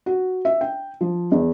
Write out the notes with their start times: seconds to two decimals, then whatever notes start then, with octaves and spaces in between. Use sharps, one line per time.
0.06 F#4
0.45 E5
0.61 G5
1.01 F3
1.32 E2